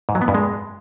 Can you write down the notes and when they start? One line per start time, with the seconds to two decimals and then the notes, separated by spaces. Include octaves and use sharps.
0.09 G#2
0.15 F#3
0.22 B3
0.28 G2
0.34 G#3